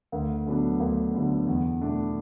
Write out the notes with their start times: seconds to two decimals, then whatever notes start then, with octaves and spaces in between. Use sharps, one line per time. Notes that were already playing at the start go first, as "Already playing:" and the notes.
0.12 D2
0.46 D3 F#3 B3 D4
0.80 D2
1.14 D3 F#3 B3 D4
1.47 E2
1.81 B2 A3 D4